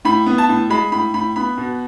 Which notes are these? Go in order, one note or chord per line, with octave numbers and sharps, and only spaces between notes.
A2 B5
B3
A5
A2
G#3 B5
A2 B5
A2 B5
B3 B5
B2